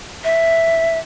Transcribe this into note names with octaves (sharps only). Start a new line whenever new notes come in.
E5